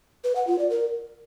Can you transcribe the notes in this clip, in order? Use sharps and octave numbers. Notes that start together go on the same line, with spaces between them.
B4
F#5
F4
D5
A#4